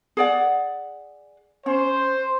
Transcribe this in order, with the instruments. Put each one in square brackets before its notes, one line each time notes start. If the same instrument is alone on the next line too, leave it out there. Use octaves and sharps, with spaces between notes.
[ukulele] G#4 D5 F#5
[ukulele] C#4 [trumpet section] C5